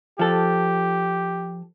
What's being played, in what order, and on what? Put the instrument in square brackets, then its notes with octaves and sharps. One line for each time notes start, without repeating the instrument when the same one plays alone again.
[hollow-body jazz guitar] F3 A4 [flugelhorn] G4